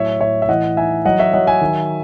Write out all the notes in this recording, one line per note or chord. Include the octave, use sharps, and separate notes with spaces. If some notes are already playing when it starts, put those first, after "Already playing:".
Already playing: A2 F#3 C#5 E5
A2 C#5 E5
E5
E3 D#5 F#5
D#4 E5 G#5
F#3 D#5 F#5
C#5 E5
F#3 D#5 F#5
E5 G#5
D#3